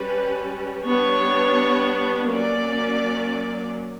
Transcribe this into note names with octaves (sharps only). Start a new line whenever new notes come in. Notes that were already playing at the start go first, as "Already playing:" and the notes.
Already playing: G3 C#4 B4
G3 B3 D4 C#5
F#3 A#3 C#4 D5